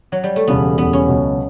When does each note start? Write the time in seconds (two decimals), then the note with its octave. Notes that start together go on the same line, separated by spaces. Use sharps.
0.12 F#3
0.24 G3
0.36 A3
0.47 E1 E2 C#3 G3 B3
0.78 E1 E2 C#3 G3 B3
0.93 C#4
1.08 C#2 B2 F#3